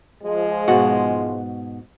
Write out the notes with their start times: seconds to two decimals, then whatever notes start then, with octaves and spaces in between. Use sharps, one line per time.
0.24 F3 G#3
0.68 G#2 B2 F#4